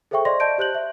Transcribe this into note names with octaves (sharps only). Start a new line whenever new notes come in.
G#4 A4 C5 E5 G5 C#6
C5 D5 D#5 C6 A#6
D5 D#5 A5 G6 D7
G4 C5 F#6 G6 F#7
E5